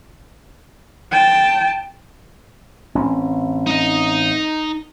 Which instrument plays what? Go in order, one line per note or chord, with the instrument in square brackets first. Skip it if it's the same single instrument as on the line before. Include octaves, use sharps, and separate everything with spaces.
[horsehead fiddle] G5 A5
[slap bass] A1 C4 C#4
[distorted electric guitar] D#4 D#5